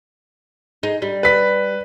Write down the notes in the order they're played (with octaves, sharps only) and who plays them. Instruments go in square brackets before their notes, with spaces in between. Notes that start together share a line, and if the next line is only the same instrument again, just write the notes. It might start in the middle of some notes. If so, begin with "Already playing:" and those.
[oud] D#4 G#4
G3
[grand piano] B4 B6